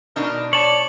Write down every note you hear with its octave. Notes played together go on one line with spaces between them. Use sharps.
B2 D4 D#4 A#4
C#5 D5 A5 F#7